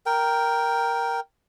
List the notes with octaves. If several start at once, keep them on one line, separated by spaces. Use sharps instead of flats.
A#4 G5